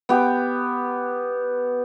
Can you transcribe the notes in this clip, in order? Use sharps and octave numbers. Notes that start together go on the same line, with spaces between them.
B3 G4